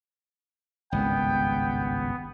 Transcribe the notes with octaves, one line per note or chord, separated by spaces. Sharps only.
G#1 C#2 G2 B3 G5